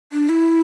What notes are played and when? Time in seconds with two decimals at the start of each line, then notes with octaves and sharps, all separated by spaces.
0.12 D4
0.29 E4